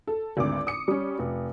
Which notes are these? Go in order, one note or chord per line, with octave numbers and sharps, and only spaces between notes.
A4
G#1 D2 D6
D#6 C#7
G3 C#4
F1